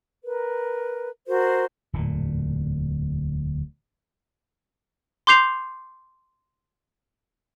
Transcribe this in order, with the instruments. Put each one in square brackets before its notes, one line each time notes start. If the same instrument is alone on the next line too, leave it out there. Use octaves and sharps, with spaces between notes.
[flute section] A#4 B4
F#4 A#4 C5
[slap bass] D1 E2 A#2
[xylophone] C6 D6 G6 C7 F7